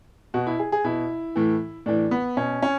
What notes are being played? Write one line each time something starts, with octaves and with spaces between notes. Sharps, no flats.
B2 F#4
E4
G#4
G#4
B2 E4
A2 E3
A2 E3 D4
B3
B2 C#4
C#4